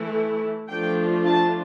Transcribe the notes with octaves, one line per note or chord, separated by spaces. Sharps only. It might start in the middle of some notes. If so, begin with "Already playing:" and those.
Already playing: E3 A3 E4
F3 A3 D4 F4 G5
A5